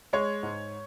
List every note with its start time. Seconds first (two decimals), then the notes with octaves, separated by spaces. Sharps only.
0.13 G#3 C#5
0.43 G#2